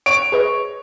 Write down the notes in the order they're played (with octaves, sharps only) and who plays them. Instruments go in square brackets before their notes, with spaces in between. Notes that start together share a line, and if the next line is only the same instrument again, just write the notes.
[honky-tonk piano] C#5 [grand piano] D7
[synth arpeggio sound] G#4 B4 D#5